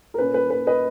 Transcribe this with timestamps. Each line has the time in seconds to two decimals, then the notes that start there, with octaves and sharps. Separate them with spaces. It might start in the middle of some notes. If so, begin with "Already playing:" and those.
0.14 A#4
0.18 A#2 A#3 C#4 B4
0.34 B4
0.50 B4
0.67 B4 D#5